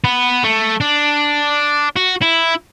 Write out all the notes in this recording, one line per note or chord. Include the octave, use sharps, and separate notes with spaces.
B3
A3
D4
F#4
E4